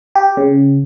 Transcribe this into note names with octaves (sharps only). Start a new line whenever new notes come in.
G4
C#3